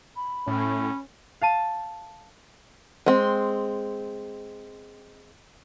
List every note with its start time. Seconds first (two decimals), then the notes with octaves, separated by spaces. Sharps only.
0.16 B5
0.47 A2 C#4
1.42 F5 A5 D#7
3.06 G#3 C4